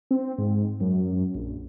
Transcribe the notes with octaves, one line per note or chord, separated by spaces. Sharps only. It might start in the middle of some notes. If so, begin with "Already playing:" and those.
C4
G#2
F#2
A#1